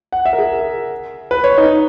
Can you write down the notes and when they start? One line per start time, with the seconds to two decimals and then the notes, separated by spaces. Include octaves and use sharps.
0.12 F#5
0.26 E5
0.33 A#4
0.39 G#4
1.31 B4
1.44 C#5
1.58 D#4